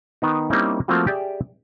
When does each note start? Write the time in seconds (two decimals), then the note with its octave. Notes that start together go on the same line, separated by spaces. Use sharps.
0.22 D#3 B3 D#4
0.50 G3 A#3 C4 C#4 D#4 E4
0.88 F3 A3 A#3 C4 F4 F#4
1.07 G4 G#4 D5 E5